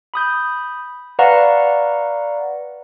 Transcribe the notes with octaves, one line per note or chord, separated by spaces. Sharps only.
B5 D#6 G6
B4 D5 F5 F#5 A#5 C#6